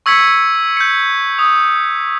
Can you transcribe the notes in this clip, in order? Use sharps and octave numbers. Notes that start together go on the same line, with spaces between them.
C#6 E6 G#6 B6 C#7
G6 C#7
D#6